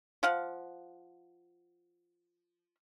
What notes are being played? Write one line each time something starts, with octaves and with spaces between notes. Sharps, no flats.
F3 F5 F#5